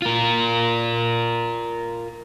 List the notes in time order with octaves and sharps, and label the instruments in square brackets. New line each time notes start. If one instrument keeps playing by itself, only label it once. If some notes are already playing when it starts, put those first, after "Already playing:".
[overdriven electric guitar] F4 A#4